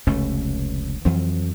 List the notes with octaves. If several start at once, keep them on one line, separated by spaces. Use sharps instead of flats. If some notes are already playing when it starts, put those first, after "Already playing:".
F1 C#2 A3 C#4
F2 E3 F#3 C4